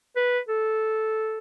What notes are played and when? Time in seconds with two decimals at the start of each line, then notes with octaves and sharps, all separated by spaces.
0.16 B4
0.48 A4